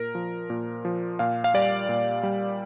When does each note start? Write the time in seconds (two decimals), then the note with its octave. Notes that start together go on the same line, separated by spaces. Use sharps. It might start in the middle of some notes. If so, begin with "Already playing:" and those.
Already playing: A#2 A#4
0.15 F3
0.50 A#2
0.85 F3
1.19 A#2 F5
1.44 F5
1.54 G3 D5
1.89 A#2
2.23 G3